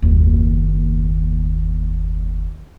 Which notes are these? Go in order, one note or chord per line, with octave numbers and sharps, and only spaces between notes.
F#1 D#2